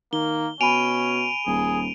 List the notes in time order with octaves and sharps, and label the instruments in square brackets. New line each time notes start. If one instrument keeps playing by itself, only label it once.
[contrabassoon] D#3 [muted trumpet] A#3 [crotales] G7
[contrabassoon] B2 [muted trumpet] C#4 [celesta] G#5 B5 [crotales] D7 D#7 F7
[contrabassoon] D#1 [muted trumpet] G#4